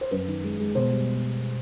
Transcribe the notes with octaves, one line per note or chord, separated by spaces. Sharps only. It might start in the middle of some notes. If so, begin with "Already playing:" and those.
C5
F#2 B4
D#3
G#3
G#3
B2 C5
G3